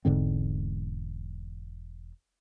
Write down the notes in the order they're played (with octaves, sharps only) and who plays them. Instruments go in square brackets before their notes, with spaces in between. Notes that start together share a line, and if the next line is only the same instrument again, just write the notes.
[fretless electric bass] E1 G#2 D3 C4